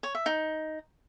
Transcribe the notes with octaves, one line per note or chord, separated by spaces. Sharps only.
C#5
E5
D#4